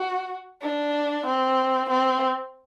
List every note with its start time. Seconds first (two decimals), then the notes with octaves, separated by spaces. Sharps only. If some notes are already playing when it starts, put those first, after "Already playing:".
Already playing: F#4
0.61 D4
1.26 C4
1.89 C4